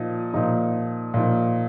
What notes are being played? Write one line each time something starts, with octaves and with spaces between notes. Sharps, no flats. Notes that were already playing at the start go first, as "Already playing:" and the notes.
Already playing: A#2 F3 D#4
A#2 F3 D#4
A#2 F3 D#4